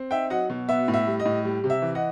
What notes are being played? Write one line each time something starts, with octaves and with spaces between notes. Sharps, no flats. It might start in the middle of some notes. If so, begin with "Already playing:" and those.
Already playing: C4
D#4 E5 G5
F#3 D#5 F#5
B2
B3 E5
A2
E5
G3
D#5
A2
G3
C3
E5
E3
D#5 F#5